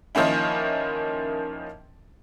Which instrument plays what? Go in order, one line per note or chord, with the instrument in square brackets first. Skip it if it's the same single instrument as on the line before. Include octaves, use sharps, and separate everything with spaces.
[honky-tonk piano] D#3 F3 A#3 C#4 E4